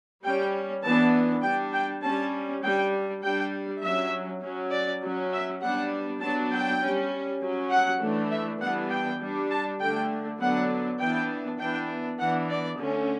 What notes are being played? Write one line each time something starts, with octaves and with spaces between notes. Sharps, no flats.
G3 C#4 G5
E3 B3 D4 A5
G3 D4 G5
G5
G3 C#4 A5
G3 D4 G5
G3 D4 G5
F#3 C#4 E5
F#3 C#4
D5
F#3 C#4
E5
G3 B3 D4 F#5
F#3 B3 D4 A5
G5
G3 C#4
F#3 C#4
F#5
E3 A3 D4
E5
E3 G3 B3 D4 F#5
G5
G3 D4
A5
D3 A3 D4 G5
D3 F#3 B3 D4 F#5
E3 B3 D4 G5
E3 B3 D4 G5
E3 B3 D4 F#5
D5
D3 A3 C#4